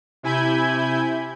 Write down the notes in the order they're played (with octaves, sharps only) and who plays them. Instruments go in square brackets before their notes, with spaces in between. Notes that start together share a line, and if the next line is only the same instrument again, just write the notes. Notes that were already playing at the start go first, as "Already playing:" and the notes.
[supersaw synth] C3 E4 G#5 B5 G6 G#6